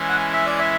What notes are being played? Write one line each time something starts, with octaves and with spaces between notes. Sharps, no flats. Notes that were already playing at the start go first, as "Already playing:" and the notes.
Already playing: E3 G#3 C#4 E4
F#5
E5
D5
E5